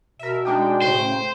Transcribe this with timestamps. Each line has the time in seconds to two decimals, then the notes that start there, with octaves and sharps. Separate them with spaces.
0.19 B2 A#4 E5
0.45 G#3 D4 D#4 G5
0.82 A2 C#3 C5